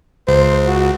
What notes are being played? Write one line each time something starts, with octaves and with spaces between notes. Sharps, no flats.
C#2 C5
F#4